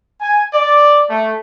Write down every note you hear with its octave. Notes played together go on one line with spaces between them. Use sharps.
G#5
D5
A3